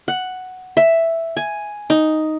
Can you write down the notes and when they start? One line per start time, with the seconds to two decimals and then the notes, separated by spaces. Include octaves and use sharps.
0.08 F#5
0.77 E5
1.37 G#5
1.90 D#4